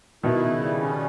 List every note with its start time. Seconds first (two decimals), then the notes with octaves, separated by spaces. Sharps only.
0.23 B2 D#3 E4
0.43 C#3
0.63 G3
0.81 C#4